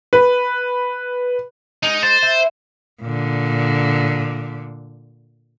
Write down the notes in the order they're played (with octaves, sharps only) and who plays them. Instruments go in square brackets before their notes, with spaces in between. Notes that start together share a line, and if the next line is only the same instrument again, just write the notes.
[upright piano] B4
[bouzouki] G#3 [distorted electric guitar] D#4
[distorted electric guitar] C5 [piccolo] A6
[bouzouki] E4
[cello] A#2 D3